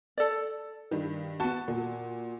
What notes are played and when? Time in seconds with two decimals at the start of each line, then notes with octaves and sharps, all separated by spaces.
0.18 A4 D5
0.91 G2 D#3
1.40 B3 F#4 A5
1.68 A#2